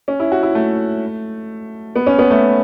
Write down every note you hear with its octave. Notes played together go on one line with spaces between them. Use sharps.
C#4
E4
F#4
E4
A3
B3
C#4
B3
A3